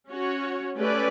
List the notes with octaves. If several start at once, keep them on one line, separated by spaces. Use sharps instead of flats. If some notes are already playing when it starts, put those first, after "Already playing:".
C#4 F#4 C#5
A3 C#4 G4 B4 D5